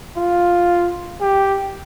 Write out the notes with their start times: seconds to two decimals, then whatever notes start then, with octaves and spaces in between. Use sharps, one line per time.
0.17 F4
1.21 G4